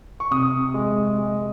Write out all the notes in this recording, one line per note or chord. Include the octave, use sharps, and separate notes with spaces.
C#6
C3 D#6
G#3
G#3